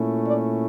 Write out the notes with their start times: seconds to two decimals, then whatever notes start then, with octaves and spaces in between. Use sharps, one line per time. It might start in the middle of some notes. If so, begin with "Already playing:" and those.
Already playing: A#2 A3 C#4 E4
0.26 D5